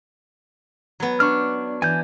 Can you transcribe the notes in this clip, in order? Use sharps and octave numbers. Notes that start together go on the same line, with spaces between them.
F#3 B3
D4 C#6 F6
E3 G#5 G6